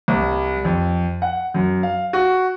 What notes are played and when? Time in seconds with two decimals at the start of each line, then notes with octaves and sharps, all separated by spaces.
0.08 C2
0.65 F2
1.22 F#5
1.54 F#2
1.83 F5
2.13 F#4